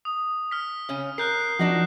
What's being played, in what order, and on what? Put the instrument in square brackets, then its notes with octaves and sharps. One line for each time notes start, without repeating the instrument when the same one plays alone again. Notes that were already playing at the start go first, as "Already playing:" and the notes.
[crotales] D#6
F6 B6
[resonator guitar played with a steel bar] C#3 C#4
[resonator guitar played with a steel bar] A#4 [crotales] F#6 G6 C7
[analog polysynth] F3 [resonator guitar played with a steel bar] D4 D#4 F#4